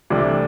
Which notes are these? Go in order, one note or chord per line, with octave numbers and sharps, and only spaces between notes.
C2 C3 E3 A3 D4